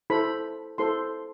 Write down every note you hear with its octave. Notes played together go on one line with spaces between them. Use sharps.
E4 A4 C5 B5
E4 A4 C5 C6